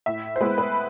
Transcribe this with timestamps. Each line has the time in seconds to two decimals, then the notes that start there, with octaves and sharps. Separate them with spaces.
0.06 A2 E5
0.36 C5
0.41 G#3 B3 E4 B4
0.58 B4